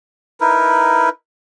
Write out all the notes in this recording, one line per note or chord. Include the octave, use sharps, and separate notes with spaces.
D#4 E4 A#4 B4